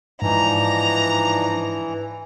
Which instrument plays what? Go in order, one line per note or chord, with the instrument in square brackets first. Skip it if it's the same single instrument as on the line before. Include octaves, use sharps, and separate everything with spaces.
[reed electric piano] G#2 [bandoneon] E3 [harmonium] F3 D4 D#4 [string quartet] A#5